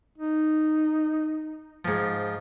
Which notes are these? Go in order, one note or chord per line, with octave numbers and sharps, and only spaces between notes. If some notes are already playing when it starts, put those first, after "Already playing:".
D#4
G#2 F3